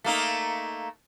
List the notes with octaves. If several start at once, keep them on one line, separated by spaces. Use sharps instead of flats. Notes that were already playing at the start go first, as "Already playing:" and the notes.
A3 A#3 D#4